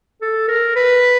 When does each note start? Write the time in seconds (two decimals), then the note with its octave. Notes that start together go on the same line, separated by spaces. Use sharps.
0.21 A4
0.48 A#4
0.76 B4